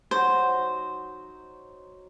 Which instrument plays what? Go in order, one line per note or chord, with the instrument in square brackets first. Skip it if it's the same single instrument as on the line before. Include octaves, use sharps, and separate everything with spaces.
[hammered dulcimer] F#3 D#4 F#4 [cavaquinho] C5